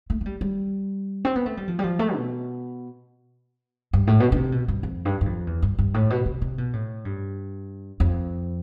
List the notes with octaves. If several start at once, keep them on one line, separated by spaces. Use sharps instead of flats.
A3
A3
G3
G3
C4
B3
A3
G3
F3
G3
F3
A3
B2
G2
A2
B2
D3
C3
B2
G2
F2
G2
G2
F2
E2
G2
G2
A2
B2
C3
C3
B2
A2
G2
F2